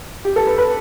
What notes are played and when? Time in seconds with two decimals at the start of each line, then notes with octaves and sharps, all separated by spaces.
0.25 G4
0.36 A4
0.47 B4
0.58 B4